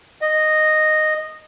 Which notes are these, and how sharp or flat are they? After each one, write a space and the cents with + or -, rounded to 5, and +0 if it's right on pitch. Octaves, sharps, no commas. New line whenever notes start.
D#5 -10